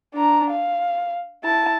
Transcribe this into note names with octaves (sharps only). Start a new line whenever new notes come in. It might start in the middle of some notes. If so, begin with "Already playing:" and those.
D4 A#5
F5
E4 A5